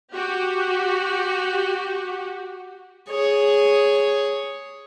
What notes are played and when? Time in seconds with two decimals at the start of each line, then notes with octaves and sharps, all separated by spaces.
0.14 F#4 G4
3.10 G#4 C#5